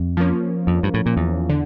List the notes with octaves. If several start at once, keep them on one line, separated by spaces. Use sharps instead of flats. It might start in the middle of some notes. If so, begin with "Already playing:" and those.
Already playing: F2
F3 A#3 C#4
F2
G2
A2
A#2
E2
D3